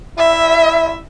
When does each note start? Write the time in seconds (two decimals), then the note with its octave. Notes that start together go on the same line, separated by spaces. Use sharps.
0.18 E4 E5